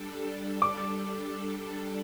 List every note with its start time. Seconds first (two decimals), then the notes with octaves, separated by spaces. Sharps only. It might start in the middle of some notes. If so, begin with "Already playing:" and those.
Already playing: G3 D4 A4
0.62 D6